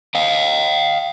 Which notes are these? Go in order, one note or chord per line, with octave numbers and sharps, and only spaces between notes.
D#5 F5